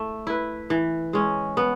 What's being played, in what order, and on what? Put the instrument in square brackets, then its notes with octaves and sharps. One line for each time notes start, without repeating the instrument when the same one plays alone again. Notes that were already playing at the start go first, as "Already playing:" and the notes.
Already playing: [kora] A3 E4
E4 B4
E3
G#3 C#4
B3